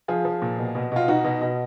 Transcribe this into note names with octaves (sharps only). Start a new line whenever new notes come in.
F3 F4 G#4
F3
A#2
B2
B2
B2 F4
B2 D#4 F#4
B2
B2